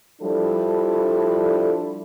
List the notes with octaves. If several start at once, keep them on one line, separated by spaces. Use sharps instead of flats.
F3 G3 D4 E4 A4